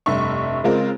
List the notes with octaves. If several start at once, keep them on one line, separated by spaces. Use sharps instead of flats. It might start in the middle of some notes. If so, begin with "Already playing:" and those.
F1 G2 E5 C#6
C#3 G#3 C4 F4 A#4